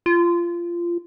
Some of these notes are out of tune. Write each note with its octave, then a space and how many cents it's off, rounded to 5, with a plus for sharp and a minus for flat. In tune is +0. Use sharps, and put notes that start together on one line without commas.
F4 -20